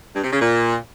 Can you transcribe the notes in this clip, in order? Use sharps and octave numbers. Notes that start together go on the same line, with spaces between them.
G2
C3
C#3
A#2